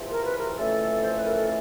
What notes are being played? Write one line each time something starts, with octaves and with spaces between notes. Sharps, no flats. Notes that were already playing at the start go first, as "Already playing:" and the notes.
Already playing: E2 C3 F3
A#4
B4
A#4
F2 C#3 E3 A3 A4
C5
B4
A#4
A4